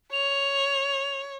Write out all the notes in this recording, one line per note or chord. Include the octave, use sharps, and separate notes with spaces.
C#5 F7